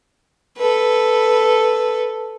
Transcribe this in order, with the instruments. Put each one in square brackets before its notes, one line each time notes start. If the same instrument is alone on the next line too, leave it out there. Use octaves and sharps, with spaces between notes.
[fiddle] A4 B4